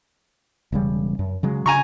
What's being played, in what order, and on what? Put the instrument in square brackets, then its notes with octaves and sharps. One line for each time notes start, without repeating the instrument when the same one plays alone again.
[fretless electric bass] E1 C#3 G3
F#2
C#3 F#3 G#3
[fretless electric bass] C#3 [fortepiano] G#5 A#5 C#6